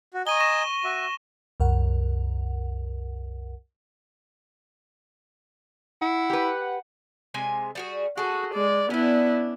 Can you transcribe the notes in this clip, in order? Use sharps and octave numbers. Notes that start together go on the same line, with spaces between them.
F#4
D#5 G#5 A#5 C#6 D#7 G7
C#6 A#6 E7
F#4 E5
C2 F#2 A#4 F#5
E4 F#5
G4 B4
C3 G#3 G#5
G3 F#4 G#4
F#4 G#4 A4
G#3 D5
B3 C#4 D4 E4